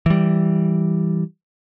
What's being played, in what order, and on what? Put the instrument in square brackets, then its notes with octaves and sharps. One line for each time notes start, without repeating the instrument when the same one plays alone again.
[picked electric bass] E3 G3